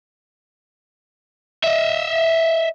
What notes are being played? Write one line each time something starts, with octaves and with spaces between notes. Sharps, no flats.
D#5 E5